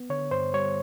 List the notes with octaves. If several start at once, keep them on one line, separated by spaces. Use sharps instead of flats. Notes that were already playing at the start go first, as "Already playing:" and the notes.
Already playing: B3
D3 C#5
G2 C5
G3 C#5